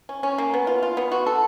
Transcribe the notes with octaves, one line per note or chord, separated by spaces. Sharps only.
C#4
C#4
A#3
B3
F4
F4
B3
F#4
A4